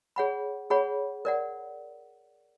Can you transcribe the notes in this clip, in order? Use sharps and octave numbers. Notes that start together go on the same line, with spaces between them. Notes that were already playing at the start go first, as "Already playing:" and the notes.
G#4 C#5 F#5 B5
G#4 C#5 F#5 B5
A#4 D5 F#5